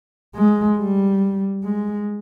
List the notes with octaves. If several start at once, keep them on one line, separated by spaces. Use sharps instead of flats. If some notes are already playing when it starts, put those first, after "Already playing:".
G#3
G3
G#3